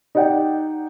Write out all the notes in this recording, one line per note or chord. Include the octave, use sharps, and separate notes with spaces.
D#4 G4 D5 F#5 G5